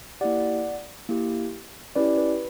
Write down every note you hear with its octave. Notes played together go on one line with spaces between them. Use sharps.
A#3 E4 G4 D5 F#5
A#3 E4 G4
C#4 E4 G4 B4 D5
B4